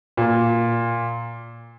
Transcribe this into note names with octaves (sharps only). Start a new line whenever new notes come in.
A#2